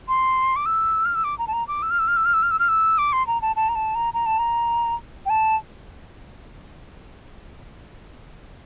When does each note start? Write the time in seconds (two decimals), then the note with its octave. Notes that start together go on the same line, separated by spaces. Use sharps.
0.08 C6
0.56 D6
0.66 E6
1.05 F6
1.15 E6
1.24 D6
1.38 A#5
1.47 A5
1.53 A#5
1.68 D6
1.82 E6
1.91 F6
1.99 E6
2.08 F6
2.17 E6
2.25 F6
2.34 E6
2.43 F6
2.51 E6
2.59 F6
2.68 E6
2.98 D6
3.13 C6
3.27 A#5
3.42 A5
3.56 A5
3.69 A#5
3.75 A5
3.95 A#5
4.14 A#5
4.26 A5
4.38 A#5
5.26 G5
5.30 A5